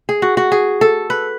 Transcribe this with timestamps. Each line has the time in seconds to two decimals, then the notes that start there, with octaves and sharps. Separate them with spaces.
0.09 G#4
0.22 F#4
0.37 F#4
0.52 G#4
0.81 A4
1.10 B4